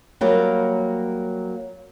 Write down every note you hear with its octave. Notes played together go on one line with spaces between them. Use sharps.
F#3 G3 A#3